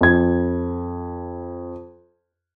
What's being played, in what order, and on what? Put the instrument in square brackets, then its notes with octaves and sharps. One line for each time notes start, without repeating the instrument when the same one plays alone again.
[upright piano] F2 G#6